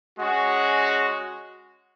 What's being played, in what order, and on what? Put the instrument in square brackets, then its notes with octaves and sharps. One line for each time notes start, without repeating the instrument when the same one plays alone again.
[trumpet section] G#3 C#4 F#4